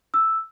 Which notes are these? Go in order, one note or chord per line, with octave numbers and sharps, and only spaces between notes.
E6